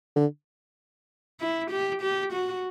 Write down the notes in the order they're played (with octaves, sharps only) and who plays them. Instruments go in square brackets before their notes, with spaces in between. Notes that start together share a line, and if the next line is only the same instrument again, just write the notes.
[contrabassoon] D3
[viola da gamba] E4
G4
G4
F#4